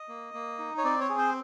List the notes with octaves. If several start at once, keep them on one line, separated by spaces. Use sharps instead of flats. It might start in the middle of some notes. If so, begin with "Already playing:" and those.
Already playing: D#5
A#3
A#3
D#4
C#5
C4 D5
C#5
G#4
C5